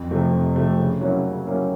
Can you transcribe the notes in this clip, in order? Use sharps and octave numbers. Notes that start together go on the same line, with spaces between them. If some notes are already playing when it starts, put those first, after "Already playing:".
Already playing: F2
C3 F3 A3
F2
C3 F3 A3
C#3
F#3 A#3 C#4 E4
C#3
F#3 A#3 C#4 E4